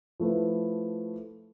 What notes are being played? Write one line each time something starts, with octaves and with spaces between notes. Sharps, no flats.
F3 A3 E4 B4